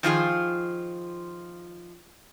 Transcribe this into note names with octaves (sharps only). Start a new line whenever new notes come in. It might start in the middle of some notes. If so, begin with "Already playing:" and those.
D#3 F3 F4 G#4